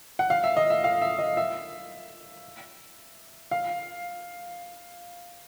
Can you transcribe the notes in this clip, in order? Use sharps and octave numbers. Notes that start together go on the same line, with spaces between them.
F#5
F5
E5
D#5
E5
F5
E5
D#5
E5
F5